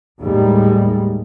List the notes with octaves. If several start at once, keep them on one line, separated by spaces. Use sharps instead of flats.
D#2 A2 G3 G#3